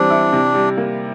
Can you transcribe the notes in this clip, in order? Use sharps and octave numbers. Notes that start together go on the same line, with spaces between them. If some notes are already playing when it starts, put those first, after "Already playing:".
Already playing: E3 G3 C4 D4
E4
C3
G3
A#3